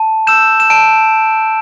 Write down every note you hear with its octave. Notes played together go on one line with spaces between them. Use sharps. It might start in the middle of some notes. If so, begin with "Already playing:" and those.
Already playing: A5
E6 G6 E7
E7
A5 D7